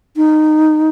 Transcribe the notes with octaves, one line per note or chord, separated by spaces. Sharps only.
D#4